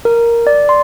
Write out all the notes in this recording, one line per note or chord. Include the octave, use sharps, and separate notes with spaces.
A#4
D5
C6